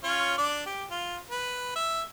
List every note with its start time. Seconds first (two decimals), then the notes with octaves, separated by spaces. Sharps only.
0.04 C#4 F4 C#5
0.38 D4 D5 D6
0.66 G4
0.91 F4
1.30 B4
1.76 E5